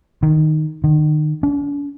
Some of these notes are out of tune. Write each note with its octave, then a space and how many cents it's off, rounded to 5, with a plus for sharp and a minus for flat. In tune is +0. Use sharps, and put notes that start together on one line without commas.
D#3 -5
D#3 -35
D4 -45